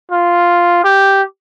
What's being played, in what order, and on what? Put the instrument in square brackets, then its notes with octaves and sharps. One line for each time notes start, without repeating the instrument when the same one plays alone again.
[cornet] F4
G4